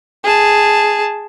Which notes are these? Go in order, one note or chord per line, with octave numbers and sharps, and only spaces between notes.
G#4 A5